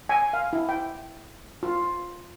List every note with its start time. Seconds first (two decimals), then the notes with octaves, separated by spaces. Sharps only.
0.09 G#5
0.33 F5
0.53 E4
0.69 G5
1.63 F4